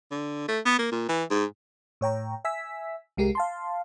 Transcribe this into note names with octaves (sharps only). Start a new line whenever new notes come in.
D3
A3
B3
A#3
A#2
E3
G#2
A2 C#5 G5 A#5
E5 G#5 E6 B6
C2 G#3 G4 A#4 C7
F5 A5 C6